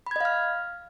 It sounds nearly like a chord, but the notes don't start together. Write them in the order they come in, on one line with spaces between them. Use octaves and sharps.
B5 G#6 D#5 F5 F6